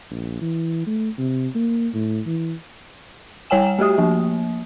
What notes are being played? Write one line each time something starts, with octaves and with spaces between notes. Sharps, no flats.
A#1
E3
A3
C3
A#3
A2
E3
G3 C#5 G5 G#5 E7
A3 F#4 G4 D#6
F3 A#3